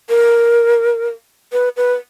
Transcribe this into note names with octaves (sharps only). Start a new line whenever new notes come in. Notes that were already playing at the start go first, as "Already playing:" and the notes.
A#4
B4
B4